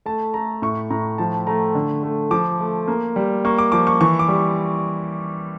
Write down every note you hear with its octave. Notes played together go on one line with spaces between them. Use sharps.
A3 A5
A3 A#5
A2 C#6
A2 A#5
F3 A5
A3 A#5
D3
A3
F3 D6
A3
A#3
G3
A#3 C#6
D6
F3 D6
C#6
E3 C#6
D6
G3